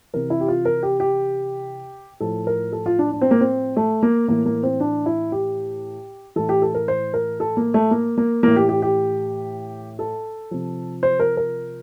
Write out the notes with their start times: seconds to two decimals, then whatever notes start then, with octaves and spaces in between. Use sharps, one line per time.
0.14 C3 E3 A#4
0.30 E4
0.40 G4
0.48 F4
0.65 A#4
0.83 G4
1.00 G4
2.20 A2 F3 A4
2.47 A#4
2.72 A4
2.86 F4
2.99 D4
3.12 D4
3.21 C4
3.31 A#3
3.41 C4
3.77 A3
4.03 A#3
4.28 A2 E3 A#3
4.46 A#3
4.63 C4
4.80 D4
5.06 E4
5.32 G4
6.36 A2 E3 A4
6.49 G4
6.62 A4
6.75 A#4
6.88 C5
7.14 A#4
7.40 A4
7.57 A#3
7.74 A3
7.91 A#3
8.18 A#3
8.43 A2 E3 A#3
8.56 G4
8.69 G4
8.82 G4
9.99 A4
10.51 C3 F3
11.03 C5
11.20 A#4
11.37 A#4